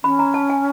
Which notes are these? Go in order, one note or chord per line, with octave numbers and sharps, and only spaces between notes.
C#4 B5
A#5
A5
G#5